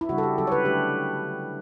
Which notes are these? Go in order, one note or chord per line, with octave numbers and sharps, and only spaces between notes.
E4
C#3 G3 D4 F#4
A4
G4
D3 F#3 C#4 A4
C#5
B4
D3 A3 D4 G4